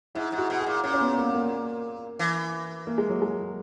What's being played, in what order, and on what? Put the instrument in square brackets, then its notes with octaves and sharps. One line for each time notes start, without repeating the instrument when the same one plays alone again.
[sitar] G#2 [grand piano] E4
[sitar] G#2
[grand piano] F#4
[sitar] B2
[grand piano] G#4
[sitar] A#2
[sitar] A#2 [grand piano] C#4
[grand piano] C#4
B3
A#3
A#3
[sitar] E3
[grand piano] A#3
G#3
F#3
G#3